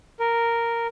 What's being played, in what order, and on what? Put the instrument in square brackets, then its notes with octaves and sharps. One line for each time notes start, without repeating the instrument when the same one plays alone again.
[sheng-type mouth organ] A#4